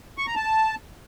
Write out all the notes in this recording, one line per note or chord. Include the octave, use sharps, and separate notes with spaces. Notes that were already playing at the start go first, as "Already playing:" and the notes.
C#6
A#5
A5